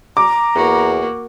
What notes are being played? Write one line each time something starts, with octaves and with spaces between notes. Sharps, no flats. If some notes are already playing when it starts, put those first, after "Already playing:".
A#5 D6
E2 A#3 F#4